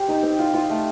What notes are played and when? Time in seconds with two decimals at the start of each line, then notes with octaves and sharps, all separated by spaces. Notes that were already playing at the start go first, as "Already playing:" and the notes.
Already playing: G4 C5
0.08 D#4
0.23 C4
0.39 F4
0.54 F4
0.70 A3